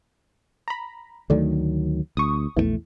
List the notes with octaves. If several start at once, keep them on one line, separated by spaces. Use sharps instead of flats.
A#5 B5
D2 D#3 F#3 A3 D4
D2 C#6 D#6
A#1 E2 D#3 E3 A3